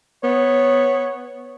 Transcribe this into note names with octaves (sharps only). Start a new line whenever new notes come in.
B3 C#5